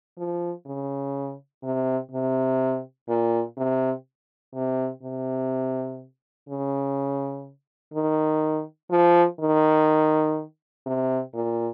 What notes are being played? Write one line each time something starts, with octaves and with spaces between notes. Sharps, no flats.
F3
C#3
C3
C3
A#2
C3
C3
C3
C#3
D#3
F3
D#3
C3
A#2